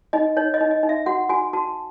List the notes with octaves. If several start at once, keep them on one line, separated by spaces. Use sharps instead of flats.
D#4 D#5
D#4 C#5
D#5
D#4
D#5
D#4
E5
F#4 F#5
F#4 G#5
F#4 A5